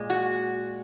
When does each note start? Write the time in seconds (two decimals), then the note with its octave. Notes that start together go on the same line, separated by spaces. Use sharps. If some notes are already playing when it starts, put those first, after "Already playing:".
Already playing: A#2 G#3
0.10 F#4